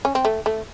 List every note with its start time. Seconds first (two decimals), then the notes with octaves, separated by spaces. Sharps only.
0.05 C#4
0.15 C4
0.25 A3
0.46 A3